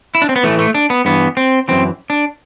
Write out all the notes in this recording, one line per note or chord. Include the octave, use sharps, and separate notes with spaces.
E4
D4
C4
B3
A2 E3 A3
A3
D4
B3
G2 E3 B3
C4
F#2 E3 C4
D4